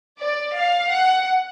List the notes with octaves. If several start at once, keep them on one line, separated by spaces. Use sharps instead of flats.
D5
F5
F#5